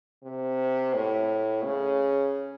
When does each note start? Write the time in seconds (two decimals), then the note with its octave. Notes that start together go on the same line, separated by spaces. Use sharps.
0.23 C3
0.94 A2
1.64 C#3